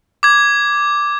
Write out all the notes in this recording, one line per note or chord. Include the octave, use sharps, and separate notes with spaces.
D6 G#6